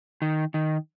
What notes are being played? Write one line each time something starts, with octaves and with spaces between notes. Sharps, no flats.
D#3
D#3